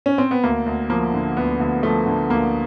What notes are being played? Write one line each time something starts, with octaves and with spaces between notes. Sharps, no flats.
C#4
C4
B3
D2 A#3
D2
F3 A#3
D3
D2 B3
D2
F3 A3
D3
D2 A#3